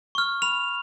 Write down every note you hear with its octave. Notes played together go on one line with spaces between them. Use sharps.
C#6 F6
B5 F7